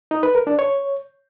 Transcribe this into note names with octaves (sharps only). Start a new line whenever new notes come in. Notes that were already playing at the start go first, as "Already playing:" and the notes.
D#4
B4
A#4
D4
C#5